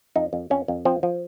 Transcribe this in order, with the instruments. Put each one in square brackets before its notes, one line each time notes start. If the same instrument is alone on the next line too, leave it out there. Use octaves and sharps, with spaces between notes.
[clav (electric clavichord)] F2 D#4
F2
F2 C#4
F2
F3 C4
F3